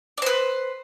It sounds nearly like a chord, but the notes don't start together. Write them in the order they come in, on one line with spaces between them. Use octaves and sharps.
D5 C5 B4